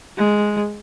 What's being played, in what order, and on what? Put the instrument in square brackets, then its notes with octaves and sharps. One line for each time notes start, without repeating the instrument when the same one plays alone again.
[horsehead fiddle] G#3